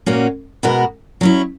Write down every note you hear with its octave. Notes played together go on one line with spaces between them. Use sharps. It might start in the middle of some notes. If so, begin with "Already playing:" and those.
A#2 A#3 C#4 F#4
B2 G#3 B3 F#4 A#4
F#3 C#4 E4